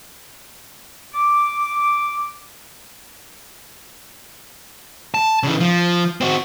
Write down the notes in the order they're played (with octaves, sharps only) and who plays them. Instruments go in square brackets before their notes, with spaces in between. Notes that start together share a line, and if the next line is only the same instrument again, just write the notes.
[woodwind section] D6
[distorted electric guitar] A5
C#3 E3
F3
C4 F#4